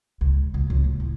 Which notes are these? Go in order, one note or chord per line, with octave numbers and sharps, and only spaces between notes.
C#2
C#2
C#2
D#2
A2